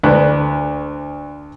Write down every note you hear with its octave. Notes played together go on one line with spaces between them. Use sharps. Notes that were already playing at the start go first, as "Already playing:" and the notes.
D2 D4 B4 F#6